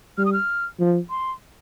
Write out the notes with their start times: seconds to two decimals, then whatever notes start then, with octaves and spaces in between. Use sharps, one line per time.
0.18 G3 F6
0.25 D#6
0.33 F6
0.80 F3
1.10 C6